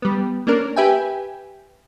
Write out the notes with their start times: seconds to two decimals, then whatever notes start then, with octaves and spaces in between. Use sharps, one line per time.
0.02 G3 B3
0.47 A#3 C#4 D4 A#4
0.76 G4 B4 E5 G5 G#5